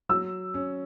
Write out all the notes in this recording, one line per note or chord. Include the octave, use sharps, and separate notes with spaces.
F#3 E6
C#4